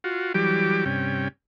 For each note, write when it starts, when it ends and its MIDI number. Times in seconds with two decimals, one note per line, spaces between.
0.04 0.33 65
0.04 0.33 66
0.34 0.84 52
0.34 0.84 54
0.34 0.84 55
0.34 0.84 67
0.34 0.84 86
0.85 1.28 43
0.85 1.28 48
0.85 1.28 61
0.85 1.28 79